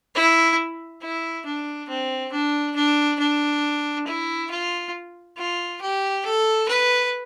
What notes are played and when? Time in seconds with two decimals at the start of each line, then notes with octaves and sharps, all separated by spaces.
0.15 E4
1.02 E4
1.46 D4
1.89 C4
2.32 D4
2.75 D4
3.19 D4
4.07 E4
4.50 F4
5.38 F4
5.81 G4
6.25 A4
6.68 B4